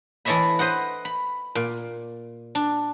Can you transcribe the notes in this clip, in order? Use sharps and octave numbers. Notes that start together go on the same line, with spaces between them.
E3 A4 C#5 D#5 E5 B5
B4 C5 D#5 F#5
B5
A#2
D4